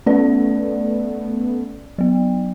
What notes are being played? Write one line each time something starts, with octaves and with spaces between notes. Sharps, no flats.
A3 B3 C#4 D5
F#3 B3